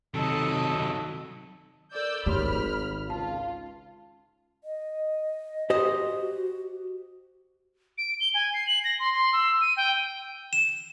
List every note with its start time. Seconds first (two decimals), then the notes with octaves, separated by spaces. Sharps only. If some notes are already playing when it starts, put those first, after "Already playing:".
0.14 C3 D#3 F#3 A4 D#5
1.95 A4 A#4 D5 E6 G6
2.26 G#1 D#4 G4 C#5 B5 C6 F6
3.10 C#2 F4 A5
4.64 D#5
5.70 F#4 G4 C5 D#5
7.98 D7
8.20 G7
8.34 G#5
8.54 C7
8.67 F#7
8.84 A#6
8.99 C6
9.14 C6
9.33 E6
9.61 D#7
9.77 G5
10.53 E7